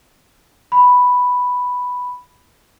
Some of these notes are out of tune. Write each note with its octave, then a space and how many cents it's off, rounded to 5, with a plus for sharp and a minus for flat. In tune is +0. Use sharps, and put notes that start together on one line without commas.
B5 +0